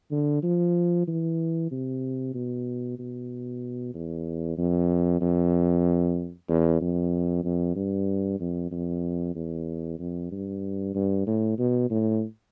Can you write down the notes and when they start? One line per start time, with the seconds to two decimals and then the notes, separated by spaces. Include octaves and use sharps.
0.11 D3
0.43 F3
1.08 E3
1.71 C3
2.34 B2
2.99 B2
3.94 E2
4.58 F2
5.21 F2
6.49 E2
6.81 F2
7.44 F2
7.76 G2
8.40 F2
8.72 F2
9.36 E2
9.99 F2
10.32 G2
10.95 G2
11.27 A2
11.59 B2
11.90 A2